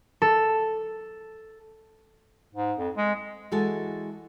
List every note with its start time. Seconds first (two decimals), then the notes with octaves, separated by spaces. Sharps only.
0.22 A4
2.54 G#2
2.79 F2
2.97 G#3
3.52 E3 G#3 F#4 A4 A5